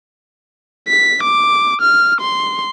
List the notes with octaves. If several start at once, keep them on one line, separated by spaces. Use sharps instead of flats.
B6
D6
F6
C6